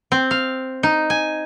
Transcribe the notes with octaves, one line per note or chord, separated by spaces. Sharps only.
C4
F5
D#4
G#5